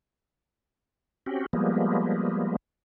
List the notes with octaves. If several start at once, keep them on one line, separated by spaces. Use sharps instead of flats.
C4 C#4 F#4 G4
F3 G3 G#3 A#3 B3